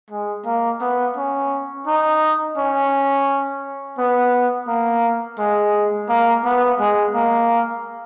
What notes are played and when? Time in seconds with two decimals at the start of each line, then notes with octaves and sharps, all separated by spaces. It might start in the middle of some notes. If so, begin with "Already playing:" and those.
0.10 G#3
0.46 A#3
0.81 B3
1.16 C#4
1.87 D#4
2.57 C#4
3.98 B3
4.68 A#3
5.39 G#3
6.09 A#3
6.44 B3
6.80 G#3
7.14 A#3